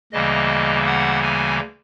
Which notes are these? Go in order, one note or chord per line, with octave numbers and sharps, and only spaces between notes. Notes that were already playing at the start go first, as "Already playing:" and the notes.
D2 C#3 E3 G3 A#3 D#5
F#5
G#5